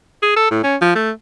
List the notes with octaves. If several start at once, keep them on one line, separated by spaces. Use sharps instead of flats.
G#4
A4
A2
C#4
F3
A3